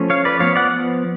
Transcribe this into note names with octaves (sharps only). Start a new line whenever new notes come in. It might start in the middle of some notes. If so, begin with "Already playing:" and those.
Already playing: F3 A3 C#4
C#5 F5
B4 D5
F3 B3 C#5 F5
D5 F#5